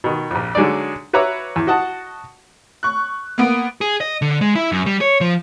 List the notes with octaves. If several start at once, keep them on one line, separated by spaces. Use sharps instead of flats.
B2 D#3
A#1 F2
D3 F#3 G#3 D#4 D5
F#4 B4 C#5 E5 A#5 D6
E2
F#4 D#5 F#5 A5
C#6 F#6
A#3 B3 D7
G#4
D#5
D3
G#3
E4
F#2
G3
C#5
F3